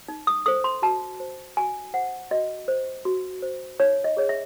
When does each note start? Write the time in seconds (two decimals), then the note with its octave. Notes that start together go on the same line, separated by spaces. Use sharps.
0.08 D#4
0.27 D#6
0.46 A4 C5 D#6
0.64 C6
0.82 F#4 A5
1.20 C5
1.57 F#4 G#5
1.94 C5 F#5
2.31 F#4 D#5
2.68 C5
3.05 F#4
3.42 C5
3.80 D#4 C#5
4.04 D#5
4.17 G#4 C#5
4.29 E5